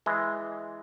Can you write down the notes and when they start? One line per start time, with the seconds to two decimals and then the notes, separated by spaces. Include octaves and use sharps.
0.06 E3 G#3